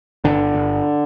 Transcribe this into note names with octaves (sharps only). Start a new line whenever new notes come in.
G1 D3
G1